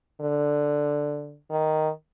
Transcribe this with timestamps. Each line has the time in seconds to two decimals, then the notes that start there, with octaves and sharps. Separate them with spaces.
0.21 D3
1.50 D#3